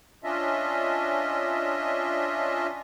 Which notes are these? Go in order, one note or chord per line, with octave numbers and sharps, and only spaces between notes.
C#4 D4 F4 D#5 E5